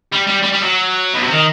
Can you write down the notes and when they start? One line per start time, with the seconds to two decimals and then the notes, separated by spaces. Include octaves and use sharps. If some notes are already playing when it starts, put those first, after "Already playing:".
0.12 G3
0.27 G3
0.42 G3
0.52 G3
0.62 F#3
1.14 B2
1.23 C3
1.32 D#3